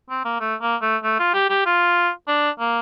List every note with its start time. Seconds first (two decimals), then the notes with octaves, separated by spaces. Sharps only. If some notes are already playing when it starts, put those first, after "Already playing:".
0.10 C4
0.25 A#3
0.40 A3
0.61 A#3
0.82 A3
1.03 A3
1.19 F4
1.34 G4
1.50 G4
1.66 F4
2.28 D4
2.60 A#3